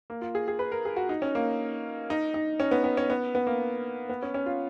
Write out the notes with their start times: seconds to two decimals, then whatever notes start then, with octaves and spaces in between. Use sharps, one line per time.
0.10 A#3
0.22 F4
0.35 G#4
0.48 G#4
0.59 B4
0.72 A#4
0.85 G#4
0.97 F#4
1.09 D#4
1.22 C#4
1.35 A#3
2.10 D#4
2.34 D#4
2.60 C#4
2.71 B3
2.84 B3
2.97 C#4
3.10 B3
3.35 B3
3.47 A#3
4.09 B3
4.22 C#4
4.34 C#4
4.46 F4